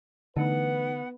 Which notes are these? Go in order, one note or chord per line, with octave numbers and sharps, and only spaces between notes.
D3 E3 A3 B3 D#4 B4 F#5